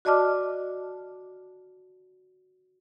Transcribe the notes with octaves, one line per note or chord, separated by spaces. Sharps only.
F#4 D5 D#5 A5 D6 F6